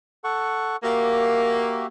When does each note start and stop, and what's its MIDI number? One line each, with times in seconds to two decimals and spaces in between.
0.24 0.76 69
0.24 0.76 78
0.24 0.76 85
0.83 1.85 58
0.83 1.87 66
0.83 1.87 67
0.83 1.87 76